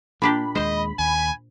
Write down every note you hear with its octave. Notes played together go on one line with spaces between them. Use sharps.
A#2 A#3 D4 G4 B5
D#2 G#3 C5 D#5
D#2 G#5